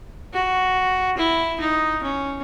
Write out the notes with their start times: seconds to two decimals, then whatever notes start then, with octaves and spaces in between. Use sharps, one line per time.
0.33 F#4
1.17 E4
1.60 D#4
2.03 C#4